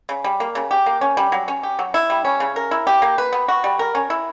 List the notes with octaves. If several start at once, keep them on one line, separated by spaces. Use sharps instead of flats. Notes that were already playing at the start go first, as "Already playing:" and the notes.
C#3
G3
A#3
C#3
G4
A#3
C#4
G3
F#3
C#4
G4
F#3
E4
G3
C#4
C#3
A#4
E4
G4
A#3
B4
B3
F#4
G3
A#4
C#4
E4